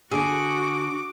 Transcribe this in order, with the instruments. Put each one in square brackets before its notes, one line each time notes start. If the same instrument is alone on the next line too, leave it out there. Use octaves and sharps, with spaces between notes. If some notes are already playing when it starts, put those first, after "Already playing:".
[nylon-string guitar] D3 A4 [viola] F#4 [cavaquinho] G#4 [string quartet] D6